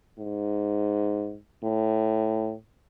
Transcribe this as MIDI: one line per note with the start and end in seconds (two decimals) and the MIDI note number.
0.18 1.36 44
1.64 2.54 45